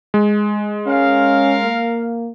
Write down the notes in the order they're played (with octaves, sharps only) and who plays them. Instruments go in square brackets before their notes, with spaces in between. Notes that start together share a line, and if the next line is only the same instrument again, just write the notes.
[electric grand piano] G#3
[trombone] C#4 [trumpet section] A#4 F5
[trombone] A#3